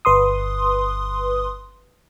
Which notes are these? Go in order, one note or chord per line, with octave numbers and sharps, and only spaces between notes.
G1 B4 C6 D#6